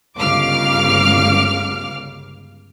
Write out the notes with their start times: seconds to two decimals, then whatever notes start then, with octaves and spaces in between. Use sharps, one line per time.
0.19 G1 C#2 F5 D6 F6